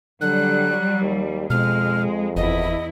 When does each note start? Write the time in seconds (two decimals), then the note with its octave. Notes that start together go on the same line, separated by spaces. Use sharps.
0.21 D3 F#3 G3 F#6
1.01 D#2
1.50 F2 B2 G#3 F6
2.37 F#1 E2 E4 D#5